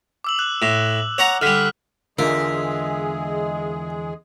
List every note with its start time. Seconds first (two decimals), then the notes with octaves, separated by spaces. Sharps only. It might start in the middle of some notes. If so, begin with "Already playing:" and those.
0.24 D6 E6 F#7
0.39 F#6
0.62 A2
1.18 C#5 F#5 A#5
1.41 D3 G3 F6 F#6 B6
2.19 E2 D3 G#3 F4 G#4 A#4 E5